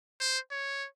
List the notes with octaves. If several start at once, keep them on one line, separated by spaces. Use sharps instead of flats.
C5
C#5